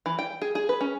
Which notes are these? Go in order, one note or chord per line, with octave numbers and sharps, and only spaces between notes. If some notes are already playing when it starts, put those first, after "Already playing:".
E3
G5
G#4
G#4
B4
C#4